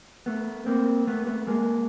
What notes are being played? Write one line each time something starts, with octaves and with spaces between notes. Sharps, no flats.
A3 B3
A#3 C4
A3 B3
A3 B3
G#3 A#3